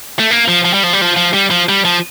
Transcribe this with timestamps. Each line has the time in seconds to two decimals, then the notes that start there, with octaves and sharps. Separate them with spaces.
0.19 A3
0.31 A#3
0.48 F3
0.65 F3
0.74 G3
0.83 F3
0.93 G3
1.01 F3
1.16 F3
1.33 G3
1.51 F3
1.69 G3
1.85 F3